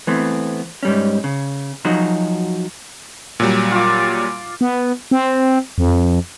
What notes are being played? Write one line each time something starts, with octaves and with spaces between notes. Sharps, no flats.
E3 A3 B3 C4
G#2 G3 C#4
C#3
F3 F#3 D#4 F#4 G#4
A#2 F#3 G3
F4 D6
B3
C4
F2